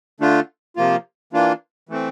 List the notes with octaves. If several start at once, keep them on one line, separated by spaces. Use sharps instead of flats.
D3 A3 D4 F4
C3 F3 A#3 F4
E3 A#3 D4 F4
E3 A3 C4